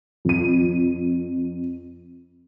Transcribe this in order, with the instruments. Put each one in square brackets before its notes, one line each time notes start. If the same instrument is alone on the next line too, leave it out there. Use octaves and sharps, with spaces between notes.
[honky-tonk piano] F2 D#7